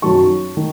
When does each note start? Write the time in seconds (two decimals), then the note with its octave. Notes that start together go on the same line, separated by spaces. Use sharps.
0.02 F#2 D#3 F#3 A5 C#6
0.57 D#3